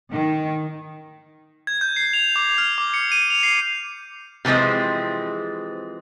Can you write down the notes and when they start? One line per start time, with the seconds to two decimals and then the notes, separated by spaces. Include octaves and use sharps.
0.11 D#3
1.67 G#6
1.81 G6
1.96 C7
2.13 F7
2.36 D6
2.58 F6
2.78 D6
2.94 C#7
3.12 D#7
3.30 F7
3.43 C7
4.45 C3 E3 F3 G#3 C4